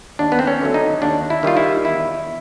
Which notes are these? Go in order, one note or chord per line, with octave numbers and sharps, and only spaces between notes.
D#2 D4
B3
C4
C#4
D3 F#3 A3
D#4
D#2 D4
E4
D#3 G3 F4
E4
E2 E4